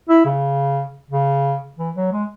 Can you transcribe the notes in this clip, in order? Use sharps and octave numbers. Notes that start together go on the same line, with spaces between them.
E4
C#3
C#3
E3
F#3
G#3